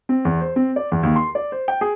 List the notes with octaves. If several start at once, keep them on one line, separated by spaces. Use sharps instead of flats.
C4
E2
C5
C4
D5
E2
D#2
C6
D5
C5
G5
G#4